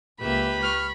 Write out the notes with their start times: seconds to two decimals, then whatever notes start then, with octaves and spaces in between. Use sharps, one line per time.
0.21 C#2 A#3 G4 B4 E5 B5
0.62 C#6 F6